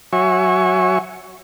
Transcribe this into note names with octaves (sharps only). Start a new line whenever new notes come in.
F#3 F#4 C#5 E5 G#5 C#6